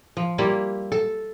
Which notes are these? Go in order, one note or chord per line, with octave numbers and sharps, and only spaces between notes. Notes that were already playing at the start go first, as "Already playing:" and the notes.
F3
G3 A#3 E4 F4
A4